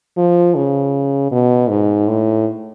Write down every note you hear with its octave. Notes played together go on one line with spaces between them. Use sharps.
F3
C#3
B2
G#2
A2